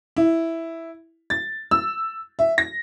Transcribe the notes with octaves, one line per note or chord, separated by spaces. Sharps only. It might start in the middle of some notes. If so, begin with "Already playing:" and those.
E4
A6
E6
E5
A#6